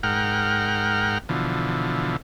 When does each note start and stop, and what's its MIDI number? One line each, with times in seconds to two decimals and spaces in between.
0.03 1.18 44
0.03 1.18 70
0.03 1.18 78
0.03 1.18 79
0.03 1.18 89
1.29 2.17 47
1.29 2.17 50
1.29 2.17 52
1.29 2.17 53